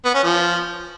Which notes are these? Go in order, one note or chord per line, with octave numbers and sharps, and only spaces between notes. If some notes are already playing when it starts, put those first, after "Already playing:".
B3
C#4
F3